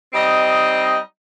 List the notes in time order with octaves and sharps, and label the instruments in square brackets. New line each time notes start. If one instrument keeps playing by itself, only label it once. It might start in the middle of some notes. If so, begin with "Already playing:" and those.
[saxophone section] G3 C4 D#4 D#5